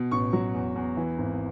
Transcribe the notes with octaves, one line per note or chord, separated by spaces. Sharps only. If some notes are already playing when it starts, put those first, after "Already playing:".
Already playing: B2
A1 C#6
F#3
E2
E2
E3
G#1